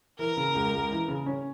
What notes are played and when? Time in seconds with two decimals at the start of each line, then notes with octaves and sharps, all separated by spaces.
0.19 E3 A#4
0.37 C#3
0.55 C#2
0.73 C#2
0.91 E3
1.08 C#3
1.26 C#4